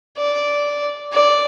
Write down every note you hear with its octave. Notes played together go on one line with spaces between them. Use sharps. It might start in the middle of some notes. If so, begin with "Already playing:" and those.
D5
D5